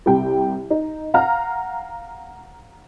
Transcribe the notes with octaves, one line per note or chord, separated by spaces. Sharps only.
C2 C3 G5
D#4
F5 F#5 A#5 F6